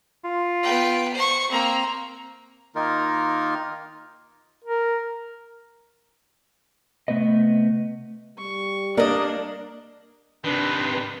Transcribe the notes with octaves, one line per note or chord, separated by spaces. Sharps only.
F4
B3 G5
C5 C#6
A#3 C4 A#5
D#3 A#3 D#4 F4 A#4
A#4
C3 F3 A3 B3 B4 D#5
G3 C#6
A#3 D4 A#4 D5 D#5
C3 D#3 D4 B4